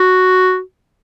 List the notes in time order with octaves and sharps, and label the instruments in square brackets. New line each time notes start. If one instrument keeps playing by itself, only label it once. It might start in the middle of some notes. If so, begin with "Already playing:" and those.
Already playing: [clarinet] F#4